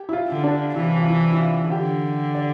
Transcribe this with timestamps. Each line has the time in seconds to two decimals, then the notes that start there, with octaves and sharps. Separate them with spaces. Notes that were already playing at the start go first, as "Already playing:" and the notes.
Already playing: G4
0.09 E4
0.13 F4
0.28 D3
0.44 D4
0.75 C3 E3 E4
0.98 F4
1.08 E4
1.33 E4
1.40 F4
1.66 F4
1.70 D3 G4
2.35 D5